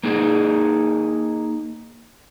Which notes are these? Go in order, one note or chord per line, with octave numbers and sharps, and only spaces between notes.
A#3 D#4 G#4